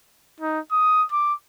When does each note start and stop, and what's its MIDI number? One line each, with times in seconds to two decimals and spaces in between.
0.40 0.60 63
0.72 1.05 87
1.12 1.34 86